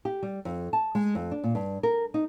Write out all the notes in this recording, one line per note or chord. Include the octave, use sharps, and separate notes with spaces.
G4
G3
F2
A5
G#3
F2
D4
A#2
G2
A#4
D#4